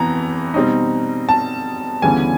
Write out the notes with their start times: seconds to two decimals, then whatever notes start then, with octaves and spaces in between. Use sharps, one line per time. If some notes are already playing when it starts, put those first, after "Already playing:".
Already playing: F2 C3 E3 B3 A#5
0.54 B2 G3 C4 D#4
1.29 A5
2.02 D2 C#3 E3 G3 B3 G#5